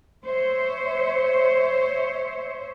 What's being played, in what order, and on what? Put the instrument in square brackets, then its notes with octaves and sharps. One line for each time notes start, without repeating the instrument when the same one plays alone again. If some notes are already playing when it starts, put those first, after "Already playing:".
[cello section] C5 C#5 E5